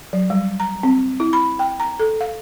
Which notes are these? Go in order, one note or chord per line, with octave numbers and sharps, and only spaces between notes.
F#3
G3
A#5
C4
E4
B5
G5
A#5
A4
F5